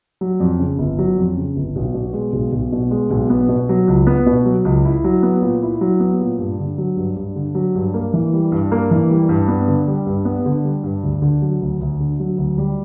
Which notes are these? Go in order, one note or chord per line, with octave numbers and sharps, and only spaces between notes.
F#3
F2
C#3
G1
F#3
F2
C#3
G1
B1
B2
G#3
B1
B1
B2
G#3
B1
B3
B2
F#3
C#2
B3
B2
F#3
C#2
E4
F#3
B3
A#2
E4
F#3
B3
A#2
G2
D3
F#3
G2
G2
D3
F#3
G2
A#3
E3
G3
G2
A#3
E3
G3
G2
B3
D3
G3
G2
B3
D3
G3
G2
D2
D3
F#3
D2
D2
D3
F#3
D2
G3